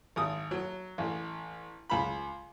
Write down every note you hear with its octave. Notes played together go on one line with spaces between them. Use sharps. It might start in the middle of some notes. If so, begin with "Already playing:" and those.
G#1 D#6
F#3
A1
C#2 B5